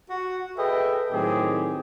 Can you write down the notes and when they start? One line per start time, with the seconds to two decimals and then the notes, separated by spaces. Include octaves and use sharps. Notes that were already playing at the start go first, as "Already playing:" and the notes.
0.10 F#4
0.57 G#4 A4 B4 D#5 E5 G5
1.11 A2 D#3 F#3 C4 G4 G#4